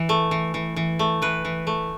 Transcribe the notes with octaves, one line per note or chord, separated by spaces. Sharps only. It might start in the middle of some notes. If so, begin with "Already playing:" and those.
Already playing: E3
A3
E3
E3
E3
A3
E3 B4
E3
A3